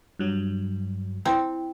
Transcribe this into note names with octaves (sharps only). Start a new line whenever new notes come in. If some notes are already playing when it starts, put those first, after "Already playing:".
G2 F#3
C4 E4 G5